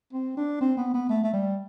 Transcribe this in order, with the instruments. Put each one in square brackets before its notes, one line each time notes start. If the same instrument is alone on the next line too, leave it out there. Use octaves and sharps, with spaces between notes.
[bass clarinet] C4
D4
C4
B3
B3
A3
A3
G3